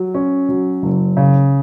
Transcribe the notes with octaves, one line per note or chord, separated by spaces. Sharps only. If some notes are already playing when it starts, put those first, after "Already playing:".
Already playing: F#3
C#4
F#3
F#1
C#3